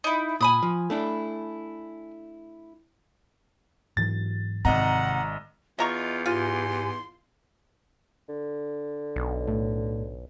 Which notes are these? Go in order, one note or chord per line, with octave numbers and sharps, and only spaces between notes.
D#4 E4
A#2 G#5 B5 D#6
F3
A3 D4 E4
G#2 E3 F#3 A6
G#1 C3 D#5 F#5 A#5
E2 F4 D#5 A#5 C#6
G#2 F4 G4 G#5 C6
D3
B1
A2